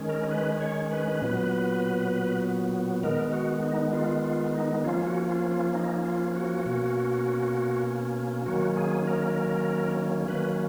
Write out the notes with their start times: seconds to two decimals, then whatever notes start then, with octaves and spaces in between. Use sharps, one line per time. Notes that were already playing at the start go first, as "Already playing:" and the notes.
Already playing: D#3 G#3 C#4
0.08 A#4
0.31 B4
0.61 C#5
0.92 B4
1.22 A#2 F#3 B3
3.03 D#3 G#3 B3 A#4
3.33 F#4
3.63 D#4
3.93 F4
4.24 F4
4.54 D#4
4.84 F3 A#3 C#4 F4
5.07 F#4
5.29 F4
5.52 F4
5.75 D#4
6.05 F4
6.35 F#4
6.66 B2 A#3 C#4
8.46 D#3 F#3 A#3 C#4 F#4
8.77 G#4
9.07 A#4
10.28 D#3 F#3 A#3 C#4 B4